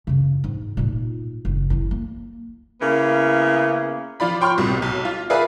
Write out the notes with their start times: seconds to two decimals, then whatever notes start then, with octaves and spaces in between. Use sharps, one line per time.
0.07 F#2 C#3
0.44 G#2
0.77 A#2 D#4
1.45 F#1
1.70 F#3 E4
1.91 A#3
2.81 C#3 A#3 B3 E4 A#4
4.20 F3 F4 D5 B5
4.41 C#5 G5 C6 C#6 F6
4.58 C2 B2
4.82 B1
5.05 F4
5.30 G#4 A#4 B4 D5 E5 F5